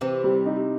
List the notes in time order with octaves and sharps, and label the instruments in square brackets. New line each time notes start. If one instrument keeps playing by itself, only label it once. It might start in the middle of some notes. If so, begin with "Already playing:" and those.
[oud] C3 E3 [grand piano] C4
[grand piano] G3
D#4